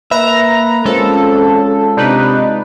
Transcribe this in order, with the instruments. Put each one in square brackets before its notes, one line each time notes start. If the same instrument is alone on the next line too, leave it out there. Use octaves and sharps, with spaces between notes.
[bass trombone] A#3 [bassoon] B4 [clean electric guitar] E5 [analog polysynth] A#5
[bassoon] F2 [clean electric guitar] G#3 F4 [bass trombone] C#4 [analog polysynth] A4
[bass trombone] C3 [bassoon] D4 [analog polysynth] D#4 B4